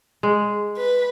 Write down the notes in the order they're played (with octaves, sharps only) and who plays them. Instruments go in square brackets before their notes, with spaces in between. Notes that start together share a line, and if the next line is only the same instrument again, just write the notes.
[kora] G#3
[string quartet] B4